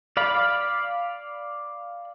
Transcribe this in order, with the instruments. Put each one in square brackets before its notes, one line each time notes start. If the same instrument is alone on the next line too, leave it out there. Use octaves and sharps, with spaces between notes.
[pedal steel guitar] D5 F5 B5